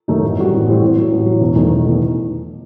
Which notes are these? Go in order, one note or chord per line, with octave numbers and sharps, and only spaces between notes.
F#2 D#3 A3 D#4
A1
A2 G3 C4 F#4
A1
A2 G3 C4 F#4
A1
A2 F#3
A1
A2 F#3
E1
E2 D#3 A3 D#4
E1
E2 D#3 A3 D#4